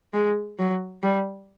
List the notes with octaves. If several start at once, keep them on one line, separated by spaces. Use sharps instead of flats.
G#3
F#3
G3